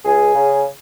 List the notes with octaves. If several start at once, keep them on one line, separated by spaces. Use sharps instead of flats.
C#2 G#4
C#3